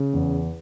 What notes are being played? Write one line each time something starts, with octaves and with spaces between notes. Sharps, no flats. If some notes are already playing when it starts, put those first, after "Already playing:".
Already playing: C#3
E2